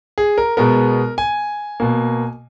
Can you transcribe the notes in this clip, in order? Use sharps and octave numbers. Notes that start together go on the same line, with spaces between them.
G#4
A#4
B2 G#3 B3 A#4
G#5
B2 A#3